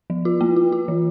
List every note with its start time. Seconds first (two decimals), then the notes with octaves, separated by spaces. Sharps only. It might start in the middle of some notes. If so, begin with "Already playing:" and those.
0.10 F3
0.25 F4
0.41 A#3
0.56 F4
0.72 F4
0.88 E3